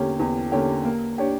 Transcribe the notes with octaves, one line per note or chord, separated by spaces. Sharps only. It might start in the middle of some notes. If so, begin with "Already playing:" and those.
Already playing: E2 D3 A#3 C#4 G4
E2
D3 A#3 C#4 G4
A#3
D4 G4 C#5